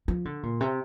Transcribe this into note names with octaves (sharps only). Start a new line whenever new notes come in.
F3
D3
A#2
C3